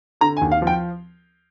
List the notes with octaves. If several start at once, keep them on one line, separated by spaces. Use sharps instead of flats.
D3 A#5
G#5
D#2
F5
F3
G5